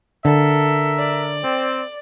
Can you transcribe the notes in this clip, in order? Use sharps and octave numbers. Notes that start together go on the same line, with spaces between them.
D3 A4 A#4 E5
D5
C4